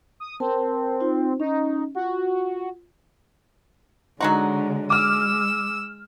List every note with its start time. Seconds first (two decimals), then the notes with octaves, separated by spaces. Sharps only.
0.20 D#6
0.40 C4 A#4 A5
1.00 D#4 F4 C5
1.40 C#4 D#4
1.95 F4 F#4
4.21 D3 F#3 G#3 D#4 F#4
4.90 G#3 D6 E6 F6